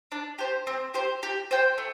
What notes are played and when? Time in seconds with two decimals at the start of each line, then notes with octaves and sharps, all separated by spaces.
0.12 D4
0.39 G4 C5
0.67 C4
0.94 G4 C5
1.23 G4
1.51 C5 G5
1.78 A3